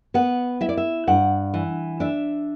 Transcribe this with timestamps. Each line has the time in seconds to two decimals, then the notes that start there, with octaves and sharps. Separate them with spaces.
0.14 B3 F#5
0.61 E4 E5
0.69 D5
0.77 E5
1.08 G2 F#5
1.54 E3
2.00 D4 E5